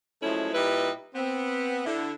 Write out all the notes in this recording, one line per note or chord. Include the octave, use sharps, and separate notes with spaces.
F3 F#3 G#3 A3 C#4 E4
A#2 G3 D#4 E4 B4
B3 C4
D3 E4